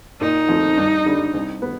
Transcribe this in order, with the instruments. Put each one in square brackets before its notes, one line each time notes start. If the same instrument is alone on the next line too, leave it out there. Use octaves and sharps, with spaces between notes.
[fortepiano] A#2 [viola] D#4
[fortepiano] F3 A3 C4
G2
D3 G3
C2
B3